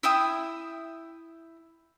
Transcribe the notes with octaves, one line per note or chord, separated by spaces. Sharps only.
E4 E5 G5 D#6